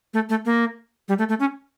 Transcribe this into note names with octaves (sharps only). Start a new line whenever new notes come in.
A3
A3
A#3
G3
A3
A3
C#4